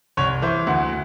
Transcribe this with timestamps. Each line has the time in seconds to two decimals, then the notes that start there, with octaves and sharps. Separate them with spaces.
0.17 C2 C#5
0.42 E3 C5
0.67 D2 F#5